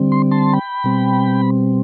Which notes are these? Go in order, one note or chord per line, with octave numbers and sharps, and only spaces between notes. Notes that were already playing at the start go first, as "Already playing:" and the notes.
Already playing: D3 G3 C4
C6
A5 C6
G5 B5
B2 G3 C4